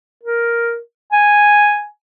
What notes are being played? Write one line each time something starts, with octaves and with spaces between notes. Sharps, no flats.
A#4
G#5